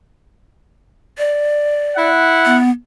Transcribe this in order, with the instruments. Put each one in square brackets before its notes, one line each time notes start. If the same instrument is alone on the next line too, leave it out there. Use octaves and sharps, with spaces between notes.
[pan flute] D5
[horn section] E4 F#5
[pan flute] B3